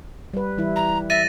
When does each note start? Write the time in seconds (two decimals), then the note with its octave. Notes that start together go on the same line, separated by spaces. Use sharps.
0.34 G3 B4
0.58 E3 G3 E4
0.76 A#5
1.10 E5 A6 A#6 D#7